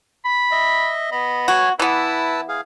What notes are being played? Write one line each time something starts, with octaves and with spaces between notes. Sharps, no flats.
B5
D#5 E5
B3 D#5 B5
F#4 C#5 G#5
E3 B3 E4 B4 A5 E6
G#4 F5